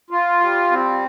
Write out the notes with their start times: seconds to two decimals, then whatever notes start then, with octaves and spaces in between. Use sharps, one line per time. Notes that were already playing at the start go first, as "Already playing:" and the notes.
0.11 F4
0.40 G3
0.71 C4